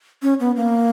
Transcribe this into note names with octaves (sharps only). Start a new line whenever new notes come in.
C#4
B3
A#3